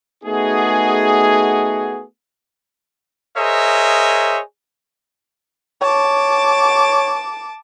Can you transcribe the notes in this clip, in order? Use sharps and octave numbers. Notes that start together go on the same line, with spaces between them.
A3 B3 D#4 F#4 G#4
G#4 A#4 C5 C#5 D#5 E5
C#5 A5 D6